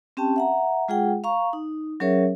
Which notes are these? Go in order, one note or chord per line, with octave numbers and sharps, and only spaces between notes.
C4 C#4 G4 G5 A5
E5 F#5 A#5
G#3 F4 G#4 F#5 G5
F5 A#5 C#6
D#4
F#3 C#4 G#4 A#4 C#5 E5